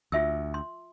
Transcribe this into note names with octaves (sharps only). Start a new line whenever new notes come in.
D2 F4 E5 E6
C6